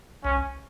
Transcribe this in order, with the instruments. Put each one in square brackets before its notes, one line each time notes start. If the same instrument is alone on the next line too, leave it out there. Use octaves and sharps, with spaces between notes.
[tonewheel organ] C2 [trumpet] C#4